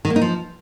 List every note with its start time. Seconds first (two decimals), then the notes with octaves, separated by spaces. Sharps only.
0.05 D#3
0.10 A#3
0.16 D#4
0.21 F3